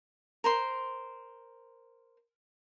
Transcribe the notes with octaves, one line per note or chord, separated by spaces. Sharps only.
A#4 C5 C6